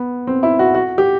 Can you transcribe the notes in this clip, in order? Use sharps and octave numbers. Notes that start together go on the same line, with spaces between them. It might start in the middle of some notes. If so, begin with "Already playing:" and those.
Already playing: B3
C4
E4
F#4
F#4
G4